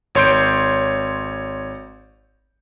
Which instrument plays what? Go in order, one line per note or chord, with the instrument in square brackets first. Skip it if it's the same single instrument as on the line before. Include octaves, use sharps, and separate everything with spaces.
[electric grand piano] G#1 C#5 C6 G6 D7